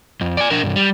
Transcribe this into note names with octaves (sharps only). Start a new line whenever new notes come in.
F2
D5 G#5
D4 A#4
C2 G2
G3